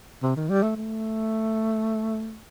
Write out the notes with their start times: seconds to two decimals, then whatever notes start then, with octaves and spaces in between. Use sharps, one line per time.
0.23 C3
0.36 D#3
0.50 G3
0.63 A3
0.77 A3